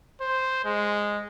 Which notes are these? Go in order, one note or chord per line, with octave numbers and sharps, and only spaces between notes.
C5
G#3